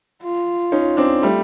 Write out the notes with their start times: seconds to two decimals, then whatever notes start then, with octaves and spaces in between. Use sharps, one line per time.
0.22 F4
0.72 C#4 D#4
0.97 C4 D4
1.22 G3 A3